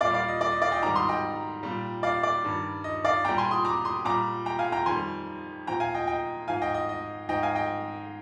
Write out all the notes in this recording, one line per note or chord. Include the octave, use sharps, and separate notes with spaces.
A#2 G3 D5 F5
D5 F5
D#5
D5
D#5
D5 F5
D#5 G5
G#2 D#3 G3 A#5 D6
C6 D#6
D#5 G5
A#2 G3
D5 F5
D5
G2 D#3 G3
D#5
D5 F5
A#2 G3 G5 A#5
G#5 C6
C6 D#6
A#5 D6
C6 D#6
A#2 G3 A#5 D6
G5 A#5
F5 G#5
G5 A#5
F2 D#3 G3 G#5 C6
A#2 F3 G5 A#5
F5 G#5
D#5 G5
D#5 G5
G#2 F3 F5 G#5
D#5 G5
D#5
D#5
G#2 F3 D#5 G5
F5 G#5
D#5 G5